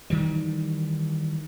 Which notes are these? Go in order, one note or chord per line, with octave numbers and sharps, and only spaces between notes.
D#3 E3 G3